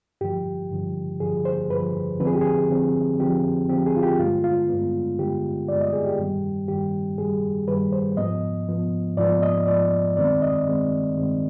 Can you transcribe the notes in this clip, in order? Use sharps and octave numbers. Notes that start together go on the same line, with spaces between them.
G2 D3 F3 G4
G2 D3 F3
G2 D3 F3 G#4
C5
G2 D3 F3 B4
D3 F3 C4 B4
G#4
G4
G#4
D3 F3 C4
D3 F3 C4 G4
D3 F3 C4 G4
G#4
F4
G4
G2 D3 G#3 B3 F4
F4
G2 D3 G#3 B3
G2 D3 G#3 B3 G4
G2 D3 G#3 B3 D5
D#5
G#4
G4
G2 D#3 G3
G2 D#3 G3 G4
G2 D#3 G3 G#4
G2 D#3 G3 B4
C5
G#2 F3 B3 D#5
G#2 F3 B3
G#2 F3 B3 D5
D#5
G#2 F3 B3 D5
G2 D#3 G#3 C4 D5
D#5
G2 D#3 G#3 C4
G2 D#3 G#3 C4